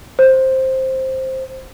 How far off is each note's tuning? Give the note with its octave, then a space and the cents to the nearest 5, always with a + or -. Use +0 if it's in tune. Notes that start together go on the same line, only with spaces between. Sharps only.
C5 +10